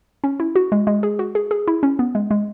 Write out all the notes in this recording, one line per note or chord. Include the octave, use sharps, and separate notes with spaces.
C#4
E4
F#4
G#3
G#3
G#4
F#4
G#4
G#4
E4
C#4
B3
G#3
G#3